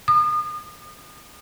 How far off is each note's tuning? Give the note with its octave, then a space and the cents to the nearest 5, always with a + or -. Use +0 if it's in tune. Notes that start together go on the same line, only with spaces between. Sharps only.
D#6 -35